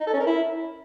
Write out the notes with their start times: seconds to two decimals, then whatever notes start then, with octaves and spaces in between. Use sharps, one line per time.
0.01 D#4
0.07 A4
0.13 C#4
0.20 A#4
0.26 E4